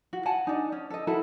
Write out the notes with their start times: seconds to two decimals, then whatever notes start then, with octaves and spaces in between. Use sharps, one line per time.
0.13 F#4
0.26 F#5 G#5 A5
0.47 D4 D#4
0.72 C#4
0.90 A4 D#5
1.07 E4 F#4 A4 A#4